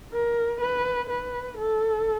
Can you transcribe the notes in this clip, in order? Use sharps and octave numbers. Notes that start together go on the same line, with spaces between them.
A#4
B4
B4
A4